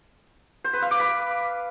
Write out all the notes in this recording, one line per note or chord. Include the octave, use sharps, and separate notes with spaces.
C5
B4
F5
D6
B5